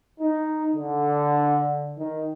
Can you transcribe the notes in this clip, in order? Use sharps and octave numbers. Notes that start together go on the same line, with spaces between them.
D#4
D3
D#3